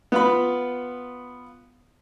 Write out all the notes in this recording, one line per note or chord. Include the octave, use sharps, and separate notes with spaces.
B3 F4 B5